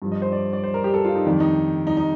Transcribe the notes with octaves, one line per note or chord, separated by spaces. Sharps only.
G2 F3
D#5
C5
D5
D5
C5
A#4
G4
A4
F4
D#4
F2 D#3 G3 D4
D#4
D#4
D#4